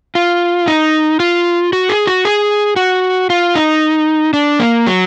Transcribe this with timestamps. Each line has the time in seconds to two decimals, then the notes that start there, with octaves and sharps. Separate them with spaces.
0.15 F4
0.68 D#4
1.20 F4
1.73 F#4
1.89 G#4
2.07 F#4
2.25 G#4
2.76 F#4
3.30 F4
3.55 D#4
4.33 D4
4.60 A#3
4.87 F#3